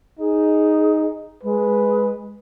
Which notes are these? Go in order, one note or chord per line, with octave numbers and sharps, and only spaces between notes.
D#4 G#4
G#3 B4